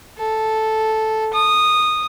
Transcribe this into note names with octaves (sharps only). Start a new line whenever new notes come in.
A4
D#6